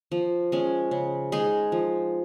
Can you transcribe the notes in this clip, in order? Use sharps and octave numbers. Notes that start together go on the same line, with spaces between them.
F3
G#3 C#4
C#3
G#3 D#4 G#4
F3